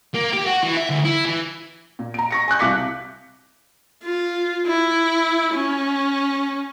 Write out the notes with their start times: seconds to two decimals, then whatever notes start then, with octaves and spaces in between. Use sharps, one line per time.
0.15 A#3
0.33 G4
0.46 F#4
0.63 E3
0.77 E5
0.90 D2
1.05 E4
1.25 E3
1.99 A#2
2.14 A#5 D7
2.31 C#6 A#6 C#7
2.48 G#5 C#6 F#6 G6
2.59 C2 F5 D6 B6 C#7
4.03 F4
4.67 E4
5.54 C#4